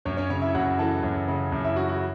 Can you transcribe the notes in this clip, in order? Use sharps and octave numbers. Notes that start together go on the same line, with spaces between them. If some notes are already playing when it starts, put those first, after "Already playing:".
F#2 C#4 C#5
C#4 C#5
C#3 C#4 C#5
E4 E5
F#2 F#4 F#5
E3 A4 A5
F#2
C#3
F#2
E4 E5
E3 F#4
F#4